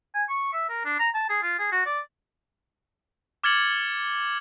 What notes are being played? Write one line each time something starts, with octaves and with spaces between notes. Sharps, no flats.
G#5
C#6
E5
A#4
D4
A#5
A5
G#4
F4
G#4
F#4
D5
D6 F6 G#6 A6 C#7 F#7